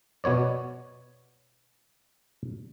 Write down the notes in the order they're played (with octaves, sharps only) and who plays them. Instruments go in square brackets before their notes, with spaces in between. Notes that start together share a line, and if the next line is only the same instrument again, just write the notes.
[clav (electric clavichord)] B2 B3 C#5 D5